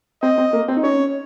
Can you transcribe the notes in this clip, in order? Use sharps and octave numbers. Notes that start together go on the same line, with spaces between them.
C4 D#5
C4
A#3
C4
D#4
C#4 C#5